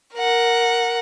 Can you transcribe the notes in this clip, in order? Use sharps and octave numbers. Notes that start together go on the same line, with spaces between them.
A#4 F#5